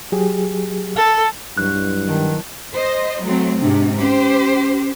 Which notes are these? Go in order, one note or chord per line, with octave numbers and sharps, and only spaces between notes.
F#3 G4 G#4
A4
B1 G2 F#3 E4 F#6
D#3 B3 G5 A5
C5 D#5
F#3 A3 C4
G#2 C3 D4
C#4 G4 C5